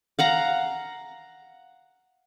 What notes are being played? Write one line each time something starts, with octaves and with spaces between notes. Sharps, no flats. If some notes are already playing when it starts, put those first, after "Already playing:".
F5 F#5 A#5